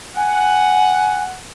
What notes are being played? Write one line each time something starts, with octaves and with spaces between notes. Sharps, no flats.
F#5 G#5